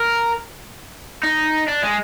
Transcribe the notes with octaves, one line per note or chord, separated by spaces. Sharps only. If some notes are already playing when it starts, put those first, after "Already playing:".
Already playing: A#4
D#4
D4
G#3